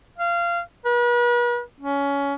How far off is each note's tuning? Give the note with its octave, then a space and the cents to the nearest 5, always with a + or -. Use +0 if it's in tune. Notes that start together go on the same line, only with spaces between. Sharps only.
F5 -20
B4 -40
C#4 +20